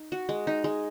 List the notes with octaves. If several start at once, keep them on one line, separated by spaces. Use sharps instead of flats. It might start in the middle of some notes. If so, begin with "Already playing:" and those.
Already playing: D#4
F#4
G#3
D#4
G#3